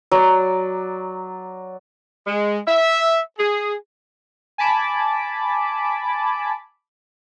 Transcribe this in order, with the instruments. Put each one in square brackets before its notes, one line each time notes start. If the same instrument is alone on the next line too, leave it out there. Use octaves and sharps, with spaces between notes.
[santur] F#3 D5
[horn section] G#3
E5
G#4
[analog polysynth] G#5 A5 B5 D6